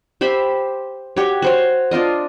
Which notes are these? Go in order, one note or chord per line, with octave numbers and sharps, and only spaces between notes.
G4 C5 E5 B5
F#4 G4 C#5
F#4 C5 C#5
D4 F4 A#4 D#5